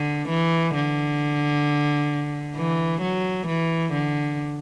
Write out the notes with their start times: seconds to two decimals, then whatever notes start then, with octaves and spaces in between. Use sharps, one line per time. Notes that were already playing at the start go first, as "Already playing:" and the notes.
Already playing: D3
0.29 E3
0.75 D3
2.56 E3
3.02 F#3
3.48 E3
3.93 D3